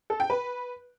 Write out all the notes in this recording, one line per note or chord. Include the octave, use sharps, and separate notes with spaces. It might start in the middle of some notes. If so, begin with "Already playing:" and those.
A4
G5
B4